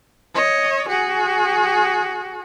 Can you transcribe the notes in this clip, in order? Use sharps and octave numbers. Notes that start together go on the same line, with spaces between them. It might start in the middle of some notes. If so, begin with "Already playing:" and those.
C#5 D#5
F#4 G#4